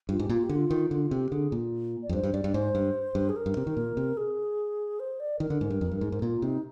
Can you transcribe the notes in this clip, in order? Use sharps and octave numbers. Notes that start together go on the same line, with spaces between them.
G2 F4
G#2 G4
A#2 F4
G4
D3 F4
D#3
D3 F4
F4
C3 G4
D3 G#4
A#2
D5
F2
G2 C5
G2
G2 D5
G2
G#2 C5
G2
G2
G#4
A#4
G2
C3
D#3
A#2
C3
G#4
C5
D5
D#3 A#4
D3
G#2
G2
F2
G2
G#2
G#2
A#2 F4
C3 D#4